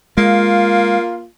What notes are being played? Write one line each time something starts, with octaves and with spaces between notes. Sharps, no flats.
G#3 A#3 F4